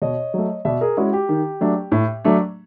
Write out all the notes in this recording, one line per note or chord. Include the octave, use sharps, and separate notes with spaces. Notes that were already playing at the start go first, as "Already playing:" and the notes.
B2 C#5 D#5
F#3 A3
B2 D5 E5
G#4 A#4
G#3 C#4 E4 F#4
G4
D#3
F#3 A3 D4
A2
F#3 A3 D4